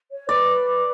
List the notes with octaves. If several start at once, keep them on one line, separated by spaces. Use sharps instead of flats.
C#5
B4 D5